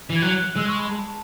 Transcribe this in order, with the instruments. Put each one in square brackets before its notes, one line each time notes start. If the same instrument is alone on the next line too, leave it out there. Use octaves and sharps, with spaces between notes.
[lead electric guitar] E3
[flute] G#6
[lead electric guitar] F#3 [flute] F#6
[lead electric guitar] G#3 [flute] E6
[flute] C#6
B5
A5